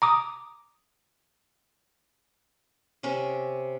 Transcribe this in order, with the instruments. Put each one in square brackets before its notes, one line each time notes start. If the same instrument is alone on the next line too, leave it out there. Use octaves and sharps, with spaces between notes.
[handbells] A#5 D6 D#6
[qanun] C3 C#4